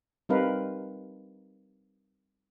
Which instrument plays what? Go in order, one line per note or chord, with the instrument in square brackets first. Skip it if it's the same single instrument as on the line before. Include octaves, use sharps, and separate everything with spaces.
[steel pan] G3 C4 D#4 A#4 B4 F5